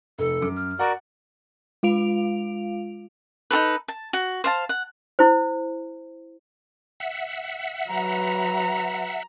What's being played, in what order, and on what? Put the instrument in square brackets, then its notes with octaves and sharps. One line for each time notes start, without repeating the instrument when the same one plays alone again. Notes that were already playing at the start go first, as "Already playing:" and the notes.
[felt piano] F1 [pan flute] A4
[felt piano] F#2 D6
[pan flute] F6
[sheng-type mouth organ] F#4 A#4 D5 [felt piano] F#5
[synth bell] G#3 F4 F5 D7 F7
[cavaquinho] D#4 F#4 A4 B4
A5
F#4
C5 F5 A5
F#5
[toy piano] E4 C5
[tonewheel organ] E5 F#5
[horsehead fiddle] F#3 B4 [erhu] A#5